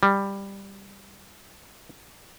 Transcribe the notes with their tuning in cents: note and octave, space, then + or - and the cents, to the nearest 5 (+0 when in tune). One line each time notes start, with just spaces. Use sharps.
G3 +10